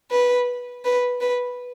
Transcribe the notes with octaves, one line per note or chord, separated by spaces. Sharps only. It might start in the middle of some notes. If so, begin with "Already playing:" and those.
B4
B4
B4